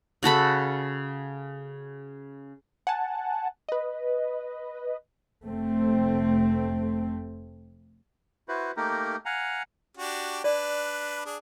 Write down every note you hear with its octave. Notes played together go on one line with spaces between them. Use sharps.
C#3 F#4 A4 B5
F#5 G#5 A5
B4 D#5
F1 A3 C4
E4 F#4 B4 C5
A3 A#3 D#4 G4 A#4
F5 F#5 G#5 A#5
D4 F#4 G4
D4 B4 D5
D4 G#4